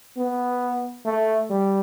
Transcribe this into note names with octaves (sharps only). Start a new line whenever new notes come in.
B3
A3
G3